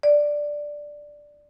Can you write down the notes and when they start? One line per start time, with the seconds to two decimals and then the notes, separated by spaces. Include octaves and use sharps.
0.03 D5